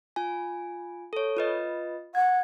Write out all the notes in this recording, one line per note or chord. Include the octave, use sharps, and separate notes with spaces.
F4 G#5
A4 C#5
F4 B4 D#5
F#5 G#6